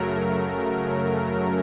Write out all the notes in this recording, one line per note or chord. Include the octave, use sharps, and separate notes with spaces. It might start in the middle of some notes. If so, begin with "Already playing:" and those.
Already playing: F#2 C#3 F#3 A3 A#4